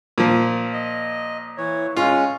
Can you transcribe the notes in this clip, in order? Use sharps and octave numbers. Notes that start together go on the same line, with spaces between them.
A#2 F3
D#5
E3 C#5
G#3 C#4 F4